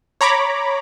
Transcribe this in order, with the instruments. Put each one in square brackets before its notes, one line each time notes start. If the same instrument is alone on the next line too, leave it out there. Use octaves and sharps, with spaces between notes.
[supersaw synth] C#5 A#5 B5 D6